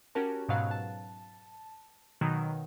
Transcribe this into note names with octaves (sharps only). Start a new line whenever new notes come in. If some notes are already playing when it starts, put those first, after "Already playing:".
C#4 F#4 G4 A#4 A5
G#2 B2 F#3 F5 F#6
A5
B2 D#3 F#3